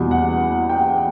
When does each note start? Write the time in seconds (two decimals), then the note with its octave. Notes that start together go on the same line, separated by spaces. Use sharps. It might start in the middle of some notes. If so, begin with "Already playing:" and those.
Already playing: E2 B2 G3
0.11 F#5
0.69 G5